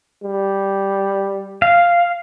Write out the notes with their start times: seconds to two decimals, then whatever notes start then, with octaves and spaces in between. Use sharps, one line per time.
0.24 G3
1.62 F5